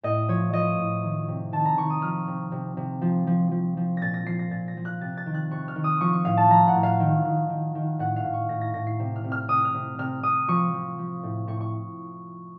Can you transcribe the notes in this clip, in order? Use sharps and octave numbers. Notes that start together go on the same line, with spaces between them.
A2 D#5
F3 C#5
F3 D#5
A2
D#3
C3
D#3 A5
A#5
D#3 C#6
D#6
F3 F6
C3
C3
C3
F3
F3
F3
F3
A#2 A6 A#6
A#6
F3 C7
A#6
A#2 A6
A#6
F3
F#6
C3 A6
A6
D#3
F#6
C3 C#6
F6
D#3
D#6
F3 C#6
C#6
A2 F5
A5
F3 A#5
F#5
A2
F5
D#3
D#3
D#3
D#3
A2 F#5
F5
A2
C#6
A2 A#6
A#6
A2 A#6
C7
C3
F6
C3
F6
C3 D#6
F6
C3
C3 F6
C3 D#6
F3 C#6
F3
F3
A2
A2 C#6
C#6